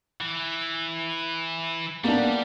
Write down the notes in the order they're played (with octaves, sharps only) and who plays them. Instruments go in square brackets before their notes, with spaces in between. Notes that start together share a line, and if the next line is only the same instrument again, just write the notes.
[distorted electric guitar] E3
[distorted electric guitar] G3 [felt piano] A#3 B3 D4